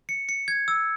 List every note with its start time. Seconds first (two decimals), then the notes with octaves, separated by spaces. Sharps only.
0.09 C#7
0.29 C#7
0.48 G#6
0.68 E6